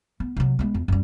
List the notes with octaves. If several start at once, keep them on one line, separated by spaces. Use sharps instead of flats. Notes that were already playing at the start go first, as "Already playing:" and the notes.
B3
C3 F#3
G#3 B3
E2
F#2 G3